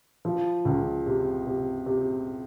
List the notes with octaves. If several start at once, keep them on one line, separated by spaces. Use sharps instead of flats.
F3
C#2
C3
C3
C3